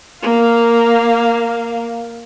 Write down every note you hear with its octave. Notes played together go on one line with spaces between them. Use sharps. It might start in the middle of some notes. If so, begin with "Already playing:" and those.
A#3 F5